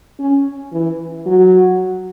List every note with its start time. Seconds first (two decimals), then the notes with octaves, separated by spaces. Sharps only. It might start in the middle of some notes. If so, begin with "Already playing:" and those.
0.19 C#4
0.72 E3
1.26 F#3